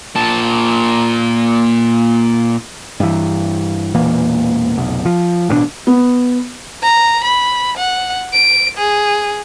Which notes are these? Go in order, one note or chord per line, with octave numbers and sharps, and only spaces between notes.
A#2 A5
G2 E3
E1 A#2 E3 A#3
F1 B1
F3
A1 G2 B2 D4
B3
A#5
B5
F#5
D7
G#4